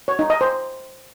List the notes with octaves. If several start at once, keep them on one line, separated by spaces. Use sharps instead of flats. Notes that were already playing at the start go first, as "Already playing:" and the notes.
C#5
D#4
D#5
C5